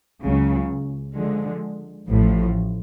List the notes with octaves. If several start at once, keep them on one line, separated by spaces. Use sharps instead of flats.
C#2 C#3 F#3
D3 F3 G#3
A1 A2 F3